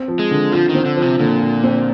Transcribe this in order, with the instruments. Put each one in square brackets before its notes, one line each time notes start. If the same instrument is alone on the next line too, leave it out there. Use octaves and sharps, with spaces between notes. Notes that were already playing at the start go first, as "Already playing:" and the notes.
Already playing: [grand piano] C4
F3
[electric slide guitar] G#3
[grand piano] D3
[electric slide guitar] F3 [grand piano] F4
[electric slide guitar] D#3
[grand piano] C4
[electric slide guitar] D3
[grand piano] F3
[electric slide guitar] C3
[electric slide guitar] A#2 [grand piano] D3
[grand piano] F4
C4